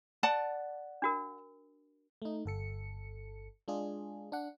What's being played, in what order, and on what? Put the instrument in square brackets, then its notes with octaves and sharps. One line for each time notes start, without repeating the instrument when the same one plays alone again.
[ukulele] D5 F#5 A5
[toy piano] D4 F#4 A#4
[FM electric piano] A3 D#4
G1 A4 C#7
G#3 D4 F4 G#4
D4 F#5